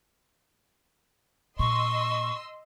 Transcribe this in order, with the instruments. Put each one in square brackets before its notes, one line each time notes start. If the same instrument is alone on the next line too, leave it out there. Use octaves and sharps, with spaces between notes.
[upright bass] A#2 [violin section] D#5 C6 E6 [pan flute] C#6